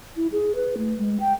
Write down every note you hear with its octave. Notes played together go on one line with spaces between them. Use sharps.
E4
G#4
B4
A3
G#3
G5